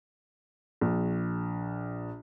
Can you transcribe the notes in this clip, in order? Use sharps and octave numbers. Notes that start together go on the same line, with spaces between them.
A#1